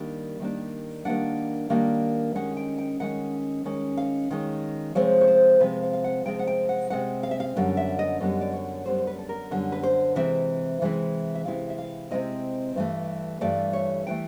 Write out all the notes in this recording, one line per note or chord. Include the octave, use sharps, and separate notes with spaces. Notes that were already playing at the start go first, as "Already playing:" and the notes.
Already playing: D#3 G3 A#3 D4
D#3 G3 A#3 D4
D#3 G3 A#3 D4 F#5
D#3 G3 A#3 D4
D#3 G#3 C#4 F#5
G5
G5
D#3 G#3 C#4 F#5
D#3 G#3 C#4
F5
D#3 G#3 C#4
C3 F3 G#3 C4 C#5
C#5
C5
C3 F3 G#3 C4 B4
F5
F5
F#5
C3 F3 G#3 C4 G5
F#5
G5
F#5
C3 F3 G#3 C4 F#5
F5
E5
F5
F#2 D3 G3 B3
E5
D#5
F#2 D3 G3 B3 D#5
D5
C#5
F#2 D3 G3 B3 C5
C5
B4
A4
A#4
F#2 D3 G3 B3
B4
C5
C3 E3 G#3 C4 E4 E5
C3 E3 G#3 C4 E4
E5
C3 E3 G#3 C4 E4 F5
E5
F5
C3 E3 G#3 C4 E4 D#5
G2 E3 A3
G2 E3 A3 D5
C#5
E3 A3 G5